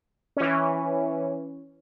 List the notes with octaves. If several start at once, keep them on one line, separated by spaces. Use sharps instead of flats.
E3 C#4